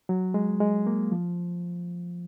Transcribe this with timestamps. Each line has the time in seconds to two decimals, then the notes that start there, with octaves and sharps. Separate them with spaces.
0.09 F#3
0.34 G#3
0.60 G#3
0.87 A#3
1.12 F3